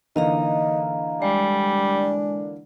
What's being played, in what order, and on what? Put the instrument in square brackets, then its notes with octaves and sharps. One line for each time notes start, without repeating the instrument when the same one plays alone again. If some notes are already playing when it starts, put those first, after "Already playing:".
[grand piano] D3 E3 A#3 [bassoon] D#4 [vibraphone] D#5 F5 A#5
[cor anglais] G3 [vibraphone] G#3 [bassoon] D4